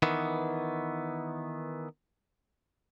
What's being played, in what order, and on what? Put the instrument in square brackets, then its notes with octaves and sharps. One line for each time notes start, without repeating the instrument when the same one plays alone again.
[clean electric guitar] D#3 E3 B3